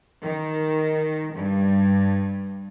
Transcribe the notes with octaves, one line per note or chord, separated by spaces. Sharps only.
D#3
G2